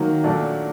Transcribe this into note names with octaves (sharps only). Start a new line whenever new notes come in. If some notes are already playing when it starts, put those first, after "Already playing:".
Already playing: D#3 F#3 A#3
A#2 F#3 A3 D4